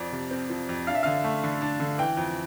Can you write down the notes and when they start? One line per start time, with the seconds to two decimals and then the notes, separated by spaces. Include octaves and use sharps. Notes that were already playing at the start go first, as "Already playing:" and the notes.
Already playing: F2 F3 D5
0.12 C3
0.31 C4
0.50 F3
0.69 F2
0.87 D4 F5
0.95 E5
1.03 D3 F5
1.24 A3
1.43 D3
1.62 D4
1.80 D3
1.98 E3 G5
2.17 F2